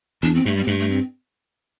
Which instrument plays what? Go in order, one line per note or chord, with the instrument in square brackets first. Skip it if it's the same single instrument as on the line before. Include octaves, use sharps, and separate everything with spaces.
[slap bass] E2 [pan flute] D4
[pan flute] C4
[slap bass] G2 [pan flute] A3
[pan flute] G3
C4
[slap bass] G2 [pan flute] A3
[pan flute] A3
C4